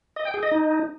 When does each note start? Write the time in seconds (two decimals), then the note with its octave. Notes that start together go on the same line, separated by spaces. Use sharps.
0.16 D#5
0.25 G5
0.34 G#4
0.43 D#5
0.51 D#4